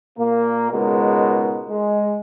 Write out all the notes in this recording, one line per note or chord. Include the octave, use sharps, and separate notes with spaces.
A#2 A#3
C#2 G#2 B2 G#3 A#4
G#3